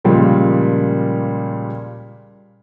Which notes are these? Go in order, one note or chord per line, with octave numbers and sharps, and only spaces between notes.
A#2 C#3 F3 G3 G#3 A#3